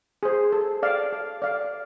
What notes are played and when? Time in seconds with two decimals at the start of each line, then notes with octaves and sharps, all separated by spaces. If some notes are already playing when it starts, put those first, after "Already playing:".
0.23 G#4 C5
0.53 A4
0.83 D5 F5
1.12 A4
1.42 D5 F5